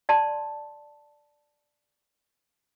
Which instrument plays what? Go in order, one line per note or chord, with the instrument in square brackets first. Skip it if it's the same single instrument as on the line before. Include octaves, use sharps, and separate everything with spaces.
[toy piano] D5 A5 C6